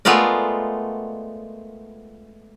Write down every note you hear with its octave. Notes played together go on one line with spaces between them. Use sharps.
G#3 A3 B3 F4 A#4 D5